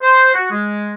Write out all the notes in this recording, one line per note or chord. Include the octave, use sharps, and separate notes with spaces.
C5
F#4
G#3